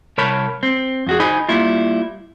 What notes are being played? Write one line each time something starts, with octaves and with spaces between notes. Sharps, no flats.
C2 A#4 C#5 A5 B5
C4
F2 F#4 G#4
D#4 C5 G#5 B5
G3 A#3 E4 F4